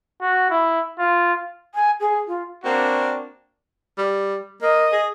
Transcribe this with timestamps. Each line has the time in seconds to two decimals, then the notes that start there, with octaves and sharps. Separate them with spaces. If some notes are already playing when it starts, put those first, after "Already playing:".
0.21 F#4
0.50 E4
0.99 F4
1.74 G#5
2.00 G#4
2.27 F4
2.64 A#3 C4 D4 F#4
3.97 G3
4.62 A#3 D#5
4.92 G#4